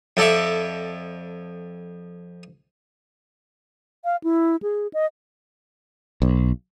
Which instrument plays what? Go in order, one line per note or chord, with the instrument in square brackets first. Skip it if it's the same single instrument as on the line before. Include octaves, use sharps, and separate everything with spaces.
[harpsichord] F2 A4 D5 E5
[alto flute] F5
E4
G#4
D#5
[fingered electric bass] B1